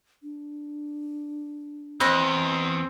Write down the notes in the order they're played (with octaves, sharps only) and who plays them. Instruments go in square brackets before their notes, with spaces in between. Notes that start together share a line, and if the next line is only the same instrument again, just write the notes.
[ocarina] D4
[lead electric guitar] E2 [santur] C4 [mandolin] D#5 B5 F#6